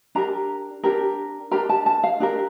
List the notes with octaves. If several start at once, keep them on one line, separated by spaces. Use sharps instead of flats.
D4 G4 A#4 A#5
D4 G4 A#4
D4 G4 A#4 A#5
A5
A5
F5
D4 G4 A#4